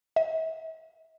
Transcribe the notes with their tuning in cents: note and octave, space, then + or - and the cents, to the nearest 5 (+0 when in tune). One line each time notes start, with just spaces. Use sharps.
E5 -45